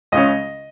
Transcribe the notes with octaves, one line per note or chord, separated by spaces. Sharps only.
C#2 C#3 G#3 C#4 D#5